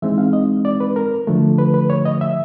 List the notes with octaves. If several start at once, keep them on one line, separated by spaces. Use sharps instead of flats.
E3 G#3 C4 D#4 E5
F5
D#5
D5
B4
A#4
D3 F3 A3
B4
B4
C#5
D#5
E5